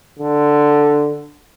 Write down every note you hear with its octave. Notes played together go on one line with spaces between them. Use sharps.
D3